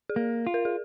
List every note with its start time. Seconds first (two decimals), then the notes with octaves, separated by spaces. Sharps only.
0.09 G#4
0.16 A#3
0.47 F4
0.54 A#4
0.65 G#4